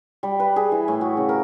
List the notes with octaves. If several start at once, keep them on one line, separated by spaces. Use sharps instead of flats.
G3
B4
G#4
E3
A2
F#4
C#3
A#4